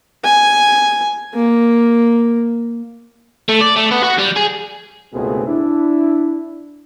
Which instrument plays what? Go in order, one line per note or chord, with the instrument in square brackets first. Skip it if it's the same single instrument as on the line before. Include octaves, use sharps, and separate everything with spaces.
[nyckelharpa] G#5
A#3
[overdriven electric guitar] A3
D5
A3
B3
F#4
G3
G#4
[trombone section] C#2 G#2 B2 A3 C4 G#4
D4 E4